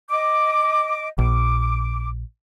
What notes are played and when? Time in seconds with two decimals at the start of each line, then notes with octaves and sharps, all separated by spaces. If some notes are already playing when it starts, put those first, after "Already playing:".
0.09 D#5 D6
1.19 A#1 D6